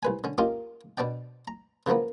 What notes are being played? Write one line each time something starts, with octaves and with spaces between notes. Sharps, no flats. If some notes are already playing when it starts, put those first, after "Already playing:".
C2 B4 G#5
D3 C#4
A#3 C#4 D#4 F4 G4 F5
B2 B3 D4 D5 G5
A#5
C#3 E3 F3 A#3 B3